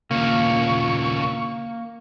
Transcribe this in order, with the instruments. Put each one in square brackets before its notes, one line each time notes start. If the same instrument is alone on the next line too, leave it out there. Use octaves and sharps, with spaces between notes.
[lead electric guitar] D#2 C#3 [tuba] A#2 [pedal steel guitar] A#3 [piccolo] C#6